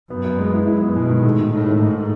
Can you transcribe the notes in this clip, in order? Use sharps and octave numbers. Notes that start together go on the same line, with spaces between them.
F#2 B3
B3
G#3
E4
F#2 E4
B3
B2 G#3
D#3
A2 A3
G#2
A2 D#3
A3
G#2 D#4